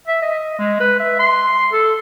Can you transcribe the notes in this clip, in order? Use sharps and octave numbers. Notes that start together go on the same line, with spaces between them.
E5
D#5
G#3
B4
E5
C6
A4